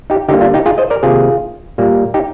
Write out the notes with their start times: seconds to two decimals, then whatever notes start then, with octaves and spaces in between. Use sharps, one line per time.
0.10 D#4 G4
0.29 D3 G3 A#3 D#4 G4
0.41 D4 F4
0.54 D#4 G4
0.66 F4 G#4
0.78 C5 D#5
0.90 A#4 D5
1.03 C3 D#3 A#3 F4 G#4
1.78 A#2 G3 A#3
2.14 D#4 G4